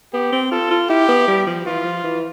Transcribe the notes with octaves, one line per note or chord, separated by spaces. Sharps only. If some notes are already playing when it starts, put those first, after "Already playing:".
B3 G4
C4
F4 A4
F4
E4 G4
B3
G3
F3
E3 F4
F3
E3